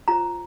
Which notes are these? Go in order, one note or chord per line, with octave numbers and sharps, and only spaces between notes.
F4 C5 A#5